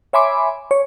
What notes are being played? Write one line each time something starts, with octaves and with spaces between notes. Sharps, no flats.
C#5 E5 G#5 B5 C6 D6
C#5